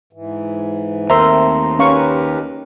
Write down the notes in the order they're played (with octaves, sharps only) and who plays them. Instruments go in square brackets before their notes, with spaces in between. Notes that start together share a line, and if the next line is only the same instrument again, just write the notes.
[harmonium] G#2 E3
[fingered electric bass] D#2 [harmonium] A3 C4 [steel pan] A#4 C5 E5 [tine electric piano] A#5 C6
[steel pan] C#4 F5 C#6 [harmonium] G4 A#4 B4